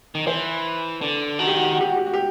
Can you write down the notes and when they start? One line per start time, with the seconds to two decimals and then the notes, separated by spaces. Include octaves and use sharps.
0.15 D#3
0.27 E3 C5
1.02 D3
1.39 D#3 F#4
1.47 G4
1.56 F#4
1.64 G4
1.73 F#4
1.81 G4
1.89 F#4
1.97 G4
2.06 F#4
2.14 G4